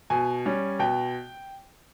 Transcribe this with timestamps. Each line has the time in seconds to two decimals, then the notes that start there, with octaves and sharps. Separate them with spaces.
0.10 B2 G#5
0.46 G3 C#4
0.79 B2 G5